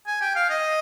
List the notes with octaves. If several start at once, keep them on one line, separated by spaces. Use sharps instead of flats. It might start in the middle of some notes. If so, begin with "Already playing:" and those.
G#5
G5
F5
D#5